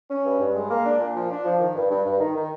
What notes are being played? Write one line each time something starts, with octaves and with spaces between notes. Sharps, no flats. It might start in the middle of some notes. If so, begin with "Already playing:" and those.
C#4
G2
G2
G#3
A#3
D4
A#2
F3
D4
F3
D#3
G2
G2
G2
D#3
D#3